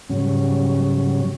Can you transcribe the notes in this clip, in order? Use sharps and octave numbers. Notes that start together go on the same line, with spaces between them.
G#2 C#3 F#3 G3 C#4